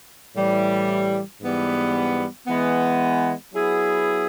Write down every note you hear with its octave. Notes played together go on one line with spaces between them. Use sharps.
A2 E3 G3
G#2 E3 G3 B3
E3 G#3 B3
F#3 B3 E4 G#4